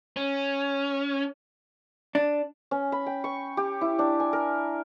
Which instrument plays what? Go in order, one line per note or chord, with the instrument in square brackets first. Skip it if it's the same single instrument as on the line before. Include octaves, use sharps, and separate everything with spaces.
[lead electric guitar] C#4
[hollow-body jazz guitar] D4
[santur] C#4
B5
G5
C#6
G4
E4
D4
G#5
A#4